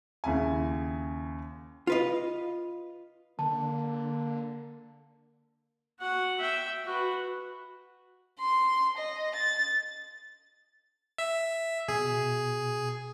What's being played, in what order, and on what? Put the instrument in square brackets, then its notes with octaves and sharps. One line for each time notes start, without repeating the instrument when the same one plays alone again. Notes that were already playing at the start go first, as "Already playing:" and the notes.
[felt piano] D#2 C#3 E4 G#5
[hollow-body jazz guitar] F4 B4 D#5
[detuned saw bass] D3 [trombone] A#3 [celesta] A5
[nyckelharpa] F#4 F#5
E5 G5
F#4 B4
[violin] C6
D#5
A6
[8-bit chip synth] E5
[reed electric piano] B2 [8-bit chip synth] G#4